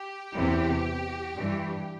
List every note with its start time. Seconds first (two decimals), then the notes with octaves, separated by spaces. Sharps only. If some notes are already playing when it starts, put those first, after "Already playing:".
Already playing: G4
0.33 E2 C3 E3
1.34 G2 E3